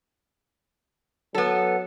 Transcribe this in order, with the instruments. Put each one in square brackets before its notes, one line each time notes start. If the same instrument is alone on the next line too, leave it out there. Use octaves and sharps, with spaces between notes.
[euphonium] F#3 [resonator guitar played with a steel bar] B3 A4